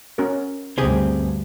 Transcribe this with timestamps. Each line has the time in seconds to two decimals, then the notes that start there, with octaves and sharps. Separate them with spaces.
0.18 C#4 F#4 A#4
0.78 D2 G2 C4 G4 G#4